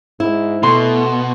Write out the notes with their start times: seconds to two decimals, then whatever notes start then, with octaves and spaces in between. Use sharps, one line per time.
0.20 G#2 E4
0.63 B2 A3 C6